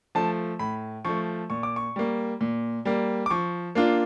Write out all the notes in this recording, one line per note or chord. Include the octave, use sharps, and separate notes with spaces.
F3 A3 A5
A2 B5
F3 A3 C#6
A#2 C#6
D6
C#6
G3 A#3
A#2
G3 A#3
D6
F3 C#6
A#3 D4 F4